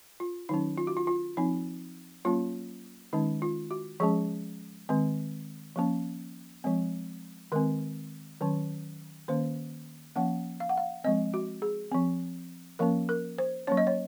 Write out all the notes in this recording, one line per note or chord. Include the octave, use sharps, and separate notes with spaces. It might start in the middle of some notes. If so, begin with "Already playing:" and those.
F4
D#3 F#3 C#4 D#4
F4
F#4
F4
F4
F3 C4 D#4
F#3 A#3 C#4 F4
D#3 G#3 C#4 D#4
F4
F#4
F3 G#3 C#4 G#4
D#3 G#3 C4
F3 A#3 C#4
F3 G#3 C4
D#3 G#3 C4 A#4
D#3 F#3 C#4
D#3 A#3 C#4 C5
F3 A#3 C#4 F#5
F5
F#5
F5
F3 G#3 C4 D#5
F#4
G#4
F3 C4
F3 A#3 C#4 A#4
A#4
C5
F#3 A#3 C#4 C#5
D#5
C#5